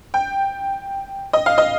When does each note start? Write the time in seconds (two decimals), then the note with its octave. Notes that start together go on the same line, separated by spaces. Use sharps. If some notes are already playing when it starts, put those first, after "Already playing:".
0.14 G5
1.33 D#5
1.46 F5
1.58 D#5